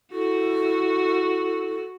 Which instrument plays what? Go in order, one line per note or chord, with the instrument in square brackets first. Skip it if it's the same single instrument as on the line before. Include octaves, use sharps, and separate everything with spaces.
[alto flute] E4 [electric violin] F#4 [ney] A4